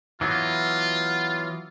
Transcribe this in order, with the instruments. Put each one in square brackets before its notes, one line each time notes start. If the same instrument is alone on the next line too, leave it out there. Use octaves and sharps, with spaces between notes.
[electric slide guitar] E3 F#3 B3 [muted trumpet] F4